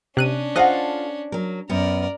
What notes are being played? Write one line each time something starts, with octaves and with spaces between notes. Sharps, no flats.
C3 C#4 D4 F#6 D#7
F4 A4 C5 D#5 F5 F#5 F#6 A#6
F#3 A#4
F#2 B3 A#4 D5